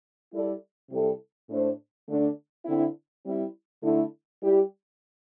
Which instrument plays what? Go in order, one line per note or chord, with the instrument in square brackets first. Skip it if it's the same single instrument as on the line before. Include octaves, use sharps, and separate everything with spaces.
[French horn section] G3 E4 A4 D5
C3 G3 E4 A4
A2 A3 D4 C5
D3 A3 D4
D3 C4 E4
G3 C4 E4
D3 A3 E4
G3 E4 G4 D5